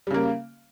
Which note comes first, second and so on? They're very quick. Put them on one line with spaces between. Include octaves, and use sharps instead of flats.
G3 C#3 A#3